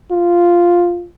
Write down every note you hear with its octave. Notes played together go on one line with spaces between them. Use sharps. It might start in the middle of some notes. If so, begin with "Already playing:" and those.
F4